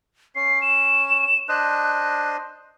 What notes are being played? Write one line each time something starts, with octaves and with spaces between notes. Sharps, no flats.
C#4 C7
E7
D4 C5 D#5 F#6